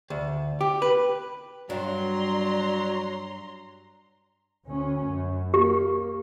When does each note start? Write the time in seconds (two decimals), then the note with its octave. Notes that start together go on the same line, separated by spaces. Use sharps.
0.10 D2
0.61 G4
0.82 B4
1.70 G2 F#3 D4 D5 A#5 C6
4.68 D2 C#4
5.08 F#2
5.54 A#3 G4